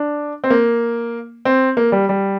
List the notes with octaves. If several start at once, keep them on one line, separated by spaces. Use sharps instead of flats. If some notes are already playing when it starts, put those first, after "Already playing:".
Already playing: D4
C4
A#3
C4
A#3
G3
G3